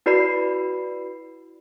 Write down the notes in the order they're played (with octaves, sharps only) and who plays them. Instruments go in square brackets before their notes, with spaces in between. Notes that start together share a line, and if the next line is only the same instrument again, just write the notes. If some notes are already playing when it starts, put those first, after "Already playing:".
[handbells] E4 F#4 B4 D5 B5 C7